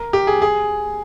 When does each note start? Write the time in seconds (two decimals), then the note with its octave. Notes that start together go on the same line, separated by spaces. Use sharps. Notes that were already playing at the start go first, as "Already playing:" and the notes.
Already playing: A#4
0.13 G4
0.27 G#4
0.42 G#4